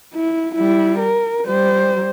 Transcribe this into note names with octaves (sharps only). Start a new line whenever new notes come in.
E4
G3 E4
A#4
G3 C5